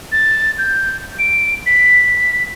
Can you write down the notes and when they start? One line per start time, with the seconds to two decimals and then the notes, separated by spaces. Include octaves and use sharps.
0.12 A6
0.58 G6
1.19 D7
1.66 B6